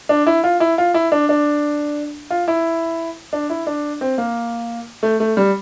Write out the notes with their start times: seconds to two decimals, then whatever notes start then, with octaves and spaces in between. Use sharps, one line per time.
0.09 D4
0.27 E4
0.44 F4
0.60 E4
0.78 F4
0.94 E4
1.12 D4
1.29 D4
2.30 F4
2.48 E4
3.33 D4
3.50 E4
3.67 D4
4.01 C4
4.18 A#3
5.03 A3
5.20 A3
5.37 G3